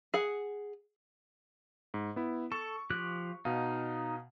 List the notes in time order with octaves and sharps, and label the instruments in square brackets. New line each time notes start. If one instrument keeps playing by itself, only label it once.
[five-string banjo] G#4 F#5
[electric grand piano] G#2
B3 E4
[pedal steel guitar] A4 [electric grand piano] C#6
[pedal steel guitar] F3 G4 F#6
[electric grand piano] B2 F5 [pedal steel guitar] D#4